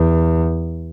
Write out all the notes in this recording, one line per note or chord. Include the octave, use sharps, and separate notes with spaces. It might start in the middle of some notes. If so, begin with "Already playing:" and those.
Already playing: E2